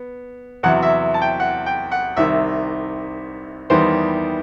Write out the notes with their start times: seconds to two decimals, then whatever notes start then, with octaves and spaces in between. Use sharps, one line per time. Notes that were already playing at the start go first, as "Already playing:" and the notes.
Already playing: B3
0.63 E2 C3 F#3 F#5
0.82 E5
1.14 A5
1.21 G5
1.40 F#5
1.66 G5
1.92 F#5
2.16 C2 C3 D#3 E5
3.70 E2 D#3 G3 B3 C5